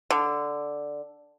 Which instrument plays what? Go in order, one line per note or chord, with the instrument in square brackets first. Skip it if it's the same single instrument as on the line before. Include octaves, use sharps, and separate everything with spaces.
[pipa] D3